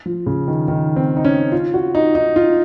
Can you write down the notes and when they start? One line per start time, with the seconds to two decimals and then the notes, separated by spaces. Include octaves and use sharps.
0.06 F3
0.26 C#3
0.48 D#3
0.68 D#3
0.96 C4
1.17 D#4
1.24 C#4
1.52 F4
1.74 F#4
1.95 D#4
2.15 D#4
2.36 F4